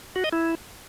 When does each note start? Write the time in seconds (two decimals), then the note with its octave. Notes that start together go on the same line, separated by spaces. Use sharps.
0.16 F#4
0.24 D#5
0.32 E4